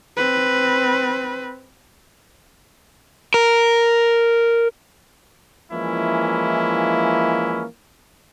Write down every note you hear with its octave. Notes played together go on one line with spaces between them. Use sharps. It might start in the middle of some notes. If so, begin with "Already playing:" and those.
C4 B4
A#4
E3 F3 G#3 A#3 C#4 E4